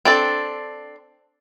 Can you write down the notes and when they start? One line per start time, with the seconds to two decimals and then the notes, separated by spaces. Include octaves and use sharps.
0.05 C4 D4 A4